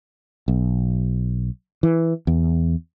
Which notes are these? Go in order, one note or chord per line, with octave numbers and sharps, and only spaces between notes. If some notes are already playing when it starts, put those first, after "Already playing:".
B1
E3
E2